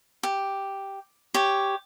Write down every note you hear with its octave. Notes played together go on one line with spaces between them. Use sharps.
G4
G4 C#5